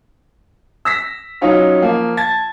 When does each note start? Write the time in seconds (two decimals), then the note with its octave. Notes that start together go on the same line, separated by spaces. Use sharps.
0.85 E6 A#6 B6
1.41 F#3 C#4 D#4 F4 C#5
1.82 F3 A#3
2.17 A5 G#6 A6